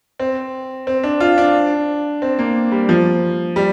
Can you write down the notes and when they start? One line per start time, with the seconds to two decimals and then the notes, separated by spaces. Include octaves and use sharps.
0.20 C4
0.87 C4
1.03 D4
1.20 F4
1.38 D4
2.22 C4
2.39 A#3
2.72 G3
2.89 F3
3.56 G3